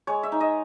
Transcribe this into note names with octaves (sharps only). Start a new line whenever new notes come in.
G#3 C#5
E5
D#4
D#5